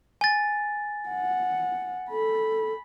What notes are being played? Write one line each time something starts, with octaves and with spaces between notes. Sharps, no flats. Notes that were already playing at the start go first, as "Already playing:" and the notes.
G#5 A6
F#5
A4 B5